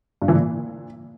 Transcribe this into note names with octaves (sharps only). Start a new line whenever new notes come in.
G2
E3
A#2